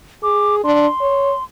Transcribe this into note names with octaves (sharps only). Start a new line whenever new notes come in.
G#4 D6
D4 C6
C#5